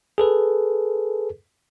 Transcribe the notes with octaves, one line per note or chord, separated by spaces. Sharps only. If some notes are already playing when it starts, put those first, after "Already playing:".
G#4 A4 B4